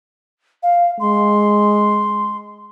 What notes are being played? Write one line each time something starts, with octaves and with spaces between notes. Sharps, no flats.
F5
G#3 C6